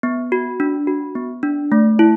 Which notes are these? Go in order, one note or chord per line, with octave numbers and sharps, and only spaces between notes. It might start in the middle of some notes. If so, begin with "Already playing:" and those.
B3
F#4
D4
F#4
B3
D4
A3
E4